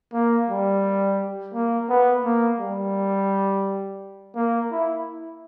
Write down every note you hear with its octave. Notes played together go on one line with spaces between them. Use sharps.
A#3
G3
A#3
B3
A#3
G3
A#3
E4